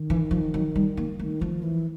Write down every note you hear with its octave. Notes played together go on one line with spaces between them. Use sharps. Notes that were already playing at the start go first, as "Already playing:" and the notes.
Already playing: D#3
E3
F3
F#3
G3
A#3
D#3 A3
F3 A3
E3